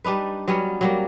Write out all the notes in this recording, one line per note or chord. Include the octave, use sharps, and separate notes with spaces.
G3 D4 D#4 B4
F#3 G3 B3 C#4
F#3 G3 A#3